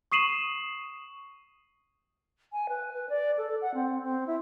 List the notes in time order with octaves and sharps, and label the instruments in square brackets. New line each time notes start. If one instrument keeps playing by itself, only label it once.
[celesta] C#6 D#6 C7 D#7 E7 F#7
[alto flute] G#5
B4
B4
D5
A4
F#5
C4
C4
E4